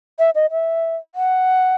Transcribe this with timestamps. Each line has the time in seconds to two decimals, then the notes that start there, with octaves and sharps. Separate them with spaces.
0.19 E5
0.35 D#5
0.51 E5
1.15 F#5